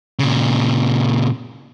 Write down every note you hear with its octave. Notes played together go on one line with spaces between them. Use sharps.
A#2 C#3